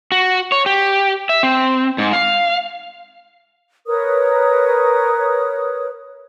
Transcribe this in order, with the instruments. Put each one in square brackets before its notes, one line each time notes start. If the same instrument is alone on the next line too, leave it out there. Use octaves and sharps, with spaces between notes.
[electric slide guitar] F#4
C#5
G4
E5
C4
G#2
F5
[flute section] A#4 B4 C#5 D#6